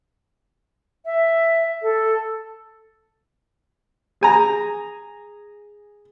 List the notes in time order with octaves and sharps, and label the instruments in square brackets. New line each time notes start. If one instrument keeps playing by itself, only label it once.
[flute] E5
A4
[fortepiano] G#4 G#5 A#5